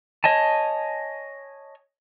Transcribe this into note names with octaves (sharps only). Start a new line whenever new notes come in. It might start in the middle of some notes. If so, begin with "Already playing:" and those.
C#5 D#5 G#5 A5